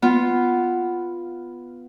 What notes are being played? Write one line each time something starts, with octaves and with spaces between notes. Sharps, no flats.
B3 F4